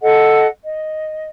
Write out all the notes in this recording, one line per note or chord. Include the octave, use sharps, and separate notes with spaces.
A4 D#5 F#5
D#5